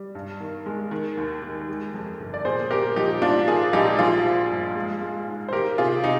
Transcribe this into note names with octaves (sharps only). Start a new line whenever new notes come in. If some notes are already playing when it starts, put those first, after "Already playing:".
Already playing: G3
G2
D#3
G#3
D#3
D#2
D#3
G#3
F2
G1
D5
A#2 G#4 C5
A#3 G4 A#4
F3 D#4 G4
G#2 D4 F4
D#3 F4 G#4
A#1 D#4 G4
F3 F4 G#4
F3
G2
G#3
G#3
G#2
C5
D#3 G4 A#4
C3 F4 G#4
C3 D#4